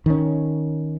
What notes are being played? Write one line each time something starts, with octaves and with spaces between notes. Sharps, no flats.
D#3 C#4